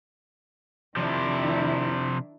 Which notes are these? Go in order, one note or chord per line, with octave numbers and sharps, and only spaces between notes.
C3 D#3 F3 D4 E4